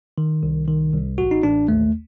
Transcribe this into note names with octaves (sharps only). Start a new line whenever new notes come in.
D#3
C2
D#3
C2
A1 F#4
D#4
A1 D4
D#2 A3